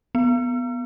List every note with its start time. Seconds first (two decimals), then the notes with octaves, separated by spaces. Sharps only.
0.15 B3